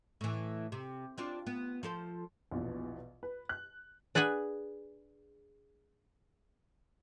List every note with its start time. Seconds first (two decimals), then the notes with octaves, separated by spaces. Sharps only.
0.21 A2 E3
0.72 C3
1.18 C4 D4 F4
1.47 B3
1.83 F3 A4 C5
2.51 A#1 E2 B2
3.23 B4
3.49 F#6
4.15 D4 G#4 B4 F#5 G#5